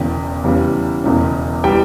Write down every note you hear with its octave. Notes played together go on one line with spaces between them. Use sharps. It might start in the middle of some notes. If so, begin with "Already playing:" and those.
Already playing: E1 E2 C#3 G5
E2 C#3 E3 G3
E1 E2 C#3
E3 G3 G5